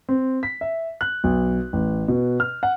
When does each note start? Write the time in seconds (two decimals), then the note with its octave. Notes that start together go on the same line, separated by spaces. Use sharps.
0.09 C4
0.43 B6
0.61 E5
1.01 F#6
1.24 B1
1.73 A1
2.08 B2
2.40 F6
2.63 F#5